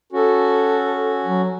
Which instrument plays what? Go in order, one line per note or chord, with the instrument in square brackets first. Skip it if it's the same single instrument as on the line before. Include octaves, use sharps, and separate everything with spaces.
[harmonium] C#4 F#4 [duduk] A4
[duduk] F#3